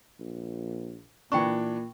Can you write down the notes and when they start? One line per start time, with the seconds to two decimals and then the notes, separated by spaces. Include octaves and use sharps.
0.20 A#1
1.32 A#2 E3 D4 G5 A#5 C#6